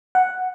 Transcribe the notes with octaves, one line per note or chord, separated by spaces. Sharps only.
F#5